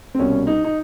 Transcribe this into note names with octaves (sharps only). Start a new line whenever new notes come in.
C4
C2 B2 C#4
D#4
D#4